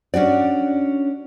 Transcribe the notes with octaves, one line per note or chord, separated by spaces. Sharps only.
C#4 D4 F#4 D5